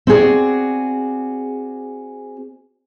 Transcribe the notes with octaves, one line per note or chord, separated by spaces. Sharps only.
C4 F#4 G#4 D5